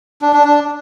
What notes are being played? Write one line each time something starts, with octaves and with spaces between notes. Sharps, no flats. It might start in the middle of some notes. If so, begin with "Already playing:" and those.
D4
D4
D4